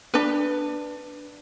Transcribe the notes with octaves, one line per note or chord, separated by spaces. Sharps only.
D4 B4